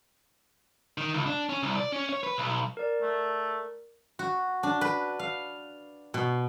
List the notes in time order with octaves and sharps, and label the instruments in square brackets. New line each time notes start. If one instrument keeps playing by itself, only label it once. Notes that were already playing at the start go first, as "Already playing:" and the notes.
[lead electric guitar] D#3
C#2
D4
C#4
C2
D5
C#4
C#5
B4
B1
[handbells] A#4 D5
[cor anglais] A3
[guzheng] F#4
D4
B4
F5
B2